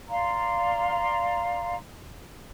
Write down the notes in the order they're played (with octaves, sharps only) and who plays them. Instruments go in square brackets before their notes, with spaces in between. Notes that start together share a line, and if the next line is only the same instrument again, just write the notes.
[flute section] D5 F5 A#5 C6